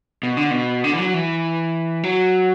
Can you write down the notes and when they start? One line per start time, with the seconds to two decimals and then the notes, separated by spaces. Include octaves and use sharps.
0.23 B2
0.37 D3
0.51 B2
0.84 D3
0.94 E3
0.99 F#3
1.14 E3
2.04 F#3